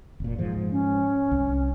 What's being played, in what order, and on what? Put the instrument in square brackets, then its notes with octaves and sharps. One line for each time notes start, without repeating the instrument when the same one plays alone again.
[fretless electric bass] F1 A#2
G#2 F3
[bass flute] C#4
[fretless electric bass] C2